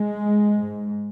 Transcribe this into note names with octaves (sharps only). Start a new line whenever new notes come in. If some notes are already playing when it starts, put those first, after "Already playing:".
Already playing: G#3
G#2